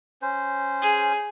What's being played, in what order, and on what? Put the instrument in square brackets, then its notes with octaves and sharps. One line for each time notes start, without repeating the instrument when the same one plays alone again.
[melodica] C#4 C5
[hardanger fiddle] G#4